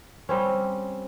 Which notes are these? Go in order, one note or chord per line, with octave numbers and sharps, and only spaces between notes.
G3 C4 C#4